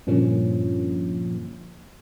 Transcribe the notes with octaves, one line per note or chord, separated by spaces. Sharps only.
G2 A#2 D3 F3 A#3 C#4